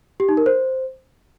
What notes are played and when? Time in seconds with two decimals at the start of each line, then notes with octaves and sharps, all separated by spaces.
0.20 G4
0.29 D#4
0.37 A#4
0.46 C5